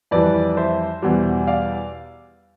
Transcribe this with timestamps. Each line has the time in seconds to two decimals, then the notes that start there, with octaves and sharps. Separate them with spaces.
0.11 F2 E3 G3 B4 D5
0.57 C5 E5
1.02 E2 B2 G3
1.47 D5 F5